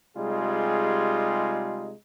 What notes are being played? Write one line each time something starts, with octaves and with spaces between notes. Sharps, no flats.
C3 G3 G#3 D#4 F4 G#4